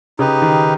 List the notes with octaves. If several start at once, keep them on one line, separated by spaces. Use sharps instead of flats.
C#3 D#4 G4 B4
D#3